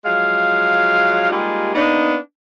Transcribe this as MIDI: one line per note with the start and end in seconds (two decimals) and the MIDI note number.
0.05 1.28 53
0.05 1.28 54
0.05 1.28 56
0.05 1.28 77
1.30 1.74 55
1.30 1.74 56
1.30 1.74 58
1.30 1.74 63
1.30 1.74 65
1.30 1.74 67
1.75 2.15 58
1.75 2.15 59
1.75 2.15 62
1.75 2.15 63